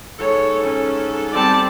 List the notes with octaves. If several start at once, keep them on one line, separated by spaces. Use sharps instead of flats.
G#2 A4 C#5
C#4
G3 C4 D5 A5